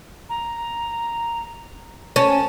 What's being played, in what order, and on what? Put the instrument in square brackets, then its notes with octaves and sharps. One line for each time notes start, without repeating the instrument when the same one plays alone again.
[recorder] A#5
[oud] C#4 [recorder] A5